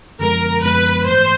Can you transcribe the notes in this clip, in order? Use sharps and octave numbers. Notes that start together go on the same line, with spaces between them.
F#2 D3 F3 G#3 B3 A#4
F#2 D3 F3 G#3 B3 B4
G#2 E3 A3 C5